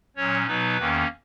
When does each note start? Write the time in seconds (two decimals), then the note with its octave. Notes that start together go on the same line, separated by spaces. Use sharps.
0.16 A#2 F#3 C#4 C#5
0.46 B2 F#3 B3 D#4 B4
0.77 E2 D#3 A#3 C#4